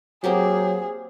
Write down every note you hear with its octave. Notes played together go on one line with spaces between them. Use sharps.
F#3 A#3 C4 G4 G#4